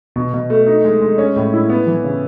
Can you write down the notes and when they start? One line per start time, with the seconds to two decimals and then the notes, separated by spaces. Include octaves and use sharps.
0.16 B2
0.34 B2
0.50 A3
0.67 D#4
0.84 G#3
1.02 G#3
1.18 C#4
1.36 A2
1.53 E4
1.70 B3
1.87 E3
2.04 C#3